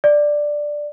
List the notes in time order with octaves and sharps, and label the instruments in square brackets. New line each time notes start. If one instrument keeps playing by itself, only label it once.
[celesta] D5